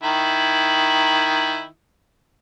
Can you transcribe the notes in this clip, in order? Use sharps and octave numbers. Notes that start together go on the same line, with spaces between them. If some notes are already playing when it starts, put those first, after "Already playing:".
D#3 E4